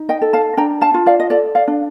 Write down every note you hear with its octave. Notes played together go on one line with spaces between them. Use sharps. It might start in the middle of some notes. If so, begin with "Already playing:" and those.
Already playing: D#4
D#5 G5
A4
F5 A5
D4 G5 A#5
F5 A5
F4
D5 F5
D#5
A4 D5
D5 F5
D4